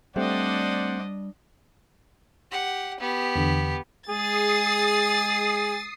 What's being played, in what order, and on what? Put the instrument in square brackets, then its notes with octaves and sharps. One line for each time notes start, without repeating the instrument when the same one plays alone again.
[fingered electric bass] G3 [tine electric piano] A3 C4 [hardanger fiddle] D4 D#5 [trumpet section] C5 D5 F#5
[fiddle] G4 F#5
B3 G4
[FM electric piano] E2 D3
[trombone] G#3 [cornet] G#4 [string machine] D#6 C7 [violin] A6